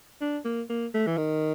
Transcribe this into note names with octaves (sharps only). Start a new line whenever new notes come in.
D4
A#3
A#3
A3
E3
D#3